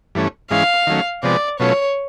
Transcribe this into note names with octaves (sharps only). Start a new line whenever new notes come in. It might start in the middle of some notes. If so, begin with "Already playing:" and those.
G2 E3 A3 C#4
G#2 E3 G#3 C#4 F5
D#3 F#3 A3 C#4
C3 F3 G#3 B3 D5
B2 F#3 A3 C#4 F4 C#5